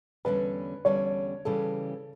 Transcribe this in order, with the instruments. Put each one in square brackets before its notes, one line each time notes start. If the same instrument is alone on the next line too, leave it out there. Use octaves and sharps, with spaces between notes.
[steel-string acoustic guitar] E2 D3 G3 C#4 [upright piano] B4
[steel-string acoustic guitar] E2 D3 G3 C#4 [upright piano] C#5
[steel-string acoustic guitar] C#3 E3 G3 C#4 G4 [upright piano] A4